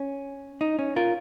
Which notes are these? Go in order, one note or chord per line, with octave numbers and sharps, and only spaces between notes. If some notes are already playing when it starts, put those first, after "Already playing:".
Already playing: C#4
D#4
C#4
F4 A#4